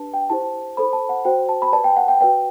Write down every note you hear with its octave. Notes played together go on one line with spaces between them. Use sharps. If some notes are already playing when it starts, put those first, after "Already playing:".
Already playing: D4 G4 B4 A5
G5
E4 G4 C5 A5
E4 A4 C5 B5
A5
F#5
F#4 C5 G5
A5
B5
G4 B4 D5 A5
G5
F#5
G5
F#4 B4 D5 G5